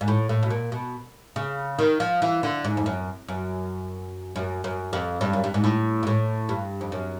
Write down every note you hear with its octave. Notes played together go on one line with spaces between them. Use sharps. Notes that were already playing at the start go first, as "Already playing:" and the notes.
G#2
A2
A2
B2
A#2
B2
C#3
D#3
F3
E3
D3
G#2
F2
F#2
F#2
F#2
F#2
F2
G2
F#2
G2
G#2
A2
G#2
A2
G2
F2
F#2